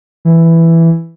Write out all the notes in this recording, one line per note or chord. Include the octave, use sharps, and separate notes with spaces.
E3